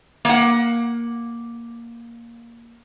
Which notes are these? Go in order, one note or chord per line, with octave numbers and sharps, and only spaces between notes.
A#3 F#5